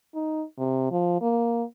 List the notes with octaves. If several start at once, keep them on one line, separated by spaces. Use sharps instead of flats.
D#4
C3
F3
A#3